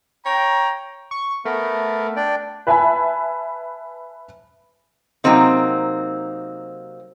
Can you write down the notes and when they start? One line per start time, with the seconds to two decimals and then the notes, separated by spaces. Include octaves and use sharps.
0.25 C#5 G5 A#5
1.11 C#6
1.45 A3 B3 A#4
2.16 D4 D5 G5
2.67 B4 E5 G#5 A5 B5
5.24 C3 F#3 A#3 C4 D#4